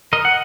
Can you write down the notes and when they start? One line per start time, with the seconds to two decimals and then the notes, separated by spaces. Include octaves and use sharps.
0.13 A#4 D#5
0.25 F#5